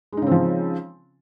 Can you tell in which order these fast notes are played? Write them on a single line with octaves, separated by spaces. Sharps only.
G#3 D#4 C#3 C4 F3